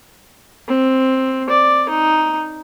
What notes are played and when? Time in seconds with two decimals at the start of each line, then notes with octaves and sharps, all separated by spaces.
0.68 C4
1.50 D5
1.90 D#4